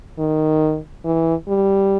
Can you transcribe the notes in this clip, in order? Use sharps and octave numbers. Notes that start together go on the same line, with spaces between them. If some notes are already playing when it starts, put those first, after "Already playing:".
D#3
E3
G3